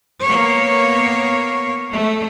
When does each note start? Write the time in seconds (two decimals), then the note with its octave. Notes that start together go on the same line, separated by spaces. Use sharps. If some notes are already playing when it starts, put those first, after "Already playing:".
0.23 A#3 B3 C#5
1.92 A3